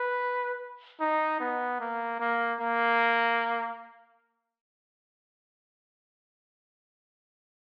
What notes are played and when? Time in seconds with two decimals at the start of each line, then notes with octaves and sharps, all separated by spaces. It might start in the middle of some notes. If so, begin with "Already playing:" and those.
Already playing: B4
1.01 D#4
1.40 B3
1.81 A#3
2.20 A#3
2.61 A#3